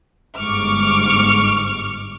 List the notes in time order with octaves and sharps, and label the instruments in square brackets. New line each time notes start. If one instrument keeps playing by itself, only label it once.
[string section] G1 G#2 C#6 D6 F6